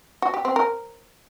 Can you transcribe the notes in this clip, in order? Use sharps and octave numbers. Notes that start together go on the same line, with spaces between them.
F#4
G4
C4
A#4